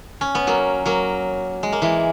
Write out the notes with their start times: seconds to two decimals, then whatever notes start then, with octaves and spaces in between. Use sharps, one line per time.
0.21 C#4
0.35 B3
0.47 F#3 A#3
0.85 F#3 A#3
1.63 G#3
1.72 A#3
1.82 E3 G#3